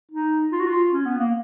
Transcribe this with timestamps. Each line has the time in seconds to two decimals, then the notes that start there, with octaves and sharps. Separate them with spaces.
0.12 D#4
0.52 F4
0.60 F#4
0.68 F4
0.93 C#4
1.05 B3
1.19 A#3